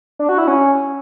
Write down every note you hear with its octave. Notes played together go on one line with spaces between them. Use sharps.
D4
F#4
E4
C#4